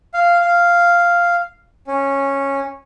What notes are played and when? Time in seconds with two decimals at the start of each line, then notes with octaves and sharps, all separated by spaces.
0.14 F5
0.40 F5
1.87 C#4